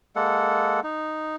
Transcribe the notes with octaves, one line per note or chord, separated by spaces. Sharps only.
G#3 A#3 A4 F#5
D#4